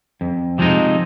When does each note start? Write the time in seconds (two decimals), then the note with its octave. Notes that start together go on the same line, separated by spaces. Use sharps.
0.21 F2
0.58 C3 F3 G#3 D#4